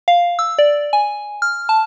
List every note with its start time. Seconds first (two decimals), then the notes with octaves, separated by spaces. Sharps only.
0.08 F5
0.39 E6
0.58 D5
0.93 G#5
1.42 F6
1.69 A5